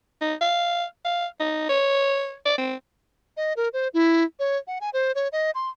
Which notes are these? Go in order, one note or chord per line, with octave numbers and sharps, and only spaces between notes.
D#4
F5
F5
D#4
C#5
D5
C4
D#5
A#4
C5
E4
C#5
F#5
G#5
C5
C#5
D#5
C6